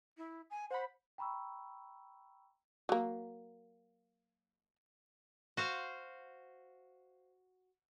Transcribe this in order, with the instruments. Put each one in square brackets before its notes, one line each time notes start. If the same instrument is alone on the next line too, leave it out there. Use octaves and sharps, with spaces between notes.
[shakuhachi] E4
G#5
[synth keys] C5 B5 [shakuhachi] F#5
[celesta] G5 A#5 B5 C#6 E6
[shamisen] F#3 A#3
[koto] F#4 C5 F5